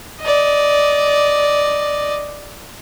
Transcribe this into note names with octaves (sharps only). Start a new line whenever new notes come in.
D5 D#5